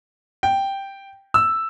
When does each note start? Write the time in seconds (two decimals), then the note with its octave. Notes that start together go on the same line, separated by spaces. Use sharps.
0.43 G5
1.34 E6